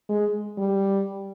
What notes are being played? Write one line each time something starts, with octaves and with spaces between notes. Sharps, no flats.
G#3
G3